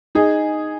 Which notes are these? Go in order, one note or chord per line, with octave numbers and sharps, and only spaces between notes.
D#4 G#4